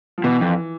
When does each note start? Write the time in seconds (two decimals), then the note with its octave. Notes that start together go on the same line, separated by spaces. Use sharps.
0.18 F3
0.24 B2 E3
0.41 F2